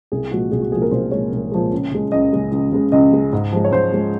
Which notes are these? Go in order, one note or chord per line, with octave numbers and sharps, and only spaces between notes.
C2 G#4
A#2 F3 G#3 F#4
C2 G#4
F#4
A#2 F3 G#3 G#4
A#4
C2 C5
A#2 F3 G#3 C#5
C2
A#2 F3 G#3
C#2
C#3 G#3
C#2 D#5
C#3 G#3
C#2
C#3 G#3
C#2 D#5
C#3 G#3
G#2
F3 G#3
C#5
G#2 C5
F3 G#3